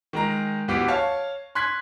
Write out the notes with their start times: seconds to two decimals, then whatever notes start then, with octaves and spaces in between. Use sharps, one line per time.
0.13 D#3 G#3 A#5
0.68 D2 E3 B3 F#4 G4
0.88 C#5 F5 A5
1.55 C6 F#6 G#6 B6